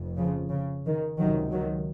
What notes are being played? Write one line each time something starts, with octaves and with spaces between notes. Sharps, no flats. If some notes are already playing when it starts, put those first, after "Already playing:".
Already playing: F1 F2
C#3 F3
C#3
D#3
C#2 C3 D#3 F#3
D#3 F#3